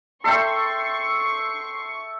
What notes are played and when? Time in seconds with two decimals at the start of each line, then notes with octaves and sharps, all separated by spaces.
0.24 A4 E5 G5 C6 C#6 C7 C#7